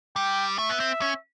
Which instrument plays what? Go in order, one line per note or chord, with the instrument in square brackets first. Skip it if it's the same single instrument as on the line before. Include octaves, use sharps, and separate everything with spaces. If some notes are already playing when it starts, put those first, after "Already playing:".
[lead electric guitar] G3 [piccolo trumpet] G5
[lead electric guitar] A3 [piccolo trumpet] E5
[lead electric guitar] B3
C4
C#4